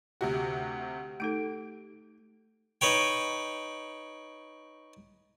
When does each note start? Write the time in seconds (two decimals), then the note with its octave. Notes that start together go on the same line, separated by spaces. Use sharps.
0.21 D2 C3 F#4 G4
1.20 A3 D#4 A4 D7
2.81 D#4 B4 C#5 G5